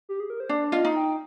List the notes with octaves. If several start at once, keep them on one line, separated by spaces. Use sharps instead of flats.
G4
G#4
A#4
C5
D4 D5
F4 D#5
D#4
G5